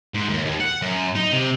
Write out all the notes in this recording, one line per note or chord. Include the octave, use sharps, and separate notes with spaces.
G#2
D#2
D#2
F#5
F#2
D#4
C3